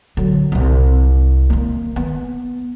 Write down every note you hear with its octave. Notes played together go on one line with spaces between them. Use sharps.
D3 F#3
C2 C3
D#3 A#3
B3